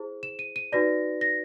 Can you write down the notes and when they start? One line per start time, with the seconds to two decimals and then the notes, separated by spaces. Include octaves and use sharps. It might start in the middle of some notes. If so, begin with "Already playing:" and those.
Already playing: E4 G#4 C5
0.23 E7
0.39 D#7
0.56 D#7
0.72 D#4 F#4 B4 D5 A#6
1.21 A#6